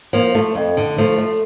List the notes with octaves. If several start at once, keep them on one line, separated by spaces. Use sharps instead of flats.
F3 A#3
A3
F2
D3
F3 A3
A3